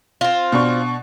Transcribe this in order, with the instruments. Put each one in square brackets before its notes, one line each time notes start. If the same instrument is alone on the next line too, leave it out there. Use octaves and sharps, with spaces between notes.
[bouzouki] C4 F4
[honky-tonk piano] B2 D4 C#6